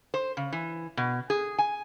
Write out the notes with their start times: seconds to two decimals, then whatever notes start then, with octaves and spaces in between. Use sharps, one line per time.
0.14 C5
0.37 C#3
0.52 E3
0.97 B2
1.30 G#4
1.58 G#5